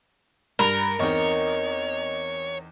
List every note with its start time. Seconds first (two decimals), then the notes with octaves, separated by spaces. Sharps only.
0.59 G2 A#4 B5
1.00 E2 C4 D#4 C#5 D#5 C#6